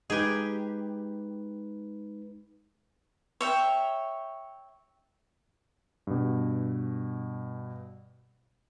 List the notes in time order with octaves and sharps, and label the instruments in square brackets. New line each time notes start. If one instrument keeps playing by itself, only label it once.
[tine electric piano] G#3 D#4 B4 [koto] G4 G#4
[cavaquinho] C#5 E5 G5
[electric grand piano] G2 B2